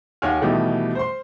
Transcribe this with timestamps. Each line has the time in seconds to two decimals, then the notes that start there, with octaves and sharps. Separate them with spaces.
0.22 D#2 C#5 F#5 G#5 F6
0.41 B2 D#3 E3 G3 A3 G4
0.95 C5 C6